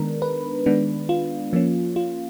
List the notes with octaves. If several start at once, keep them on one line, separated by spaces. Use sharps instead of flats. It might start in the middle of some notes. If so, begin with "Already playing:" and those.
Already playing: D#3 G#3 B3 D4 A#4
B4
D#3 G#3 B3 D4
F4
F3 A#3 C#4
F4